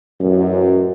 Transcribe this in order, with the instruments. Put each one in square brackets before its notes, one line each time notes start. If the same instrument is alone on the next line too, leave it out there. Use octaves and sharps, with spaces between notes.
[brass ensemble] A1 F#2